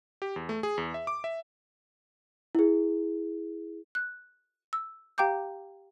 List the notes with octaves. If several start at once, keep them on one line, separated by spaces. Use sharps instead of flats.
G4
E2
A3
G#4
E2
E5
D6
E5
E4 G#4
F#6
E6
G4 F5 G5 A#5 D6 G6